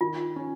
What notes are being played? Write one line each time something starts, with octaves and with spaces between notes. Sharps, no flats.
D#3 F4
C#4